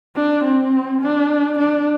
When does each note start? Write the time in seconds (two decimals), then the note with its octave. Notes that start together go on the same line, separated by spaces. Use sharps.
0.16 D4
0.44 C4
1.02 D4
1.59 D4